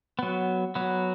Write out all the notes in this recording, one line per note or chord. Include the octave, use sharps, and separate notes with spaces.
F#3 B3
F#3 B3